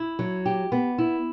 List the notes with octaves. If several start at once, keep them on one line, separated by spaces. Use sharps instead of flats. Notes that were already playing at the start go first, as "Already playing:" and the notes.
Already playing: E4
F#3
G4
B3
E4